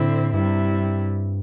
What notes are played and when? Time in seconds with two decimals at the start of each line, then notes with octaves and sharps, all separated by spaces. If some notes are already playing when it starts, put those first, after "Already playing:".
Already playing: A2 D3 C4 E4
0.34 G2 C3 G3 E4